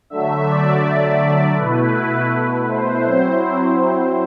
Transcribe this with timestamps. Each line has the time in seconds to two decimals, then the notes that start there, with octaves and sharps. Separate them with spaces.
0.10 D3 F#3 A3 E5
0.47 D5
0.84 D5
1.57 B2 A3 E4 B4
2.68 C5
3.05 F#3 C4 E4